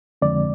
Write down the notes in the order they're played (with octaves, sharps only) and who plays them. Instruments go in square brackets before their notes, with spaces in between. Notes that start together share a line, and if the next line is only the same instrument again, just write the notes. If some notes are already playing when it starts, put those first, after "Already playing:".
[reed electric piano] F2 D3 F3 G#3 C4 D5